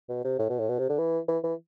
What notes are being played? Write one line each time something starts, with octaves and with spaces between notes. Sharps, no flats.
B2
C3
A2
B2
A2
B2
C3
D3
E3
E3
E3